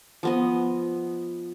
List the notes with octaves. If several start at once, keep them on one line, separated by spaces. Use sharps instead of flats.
F3 B3 D#5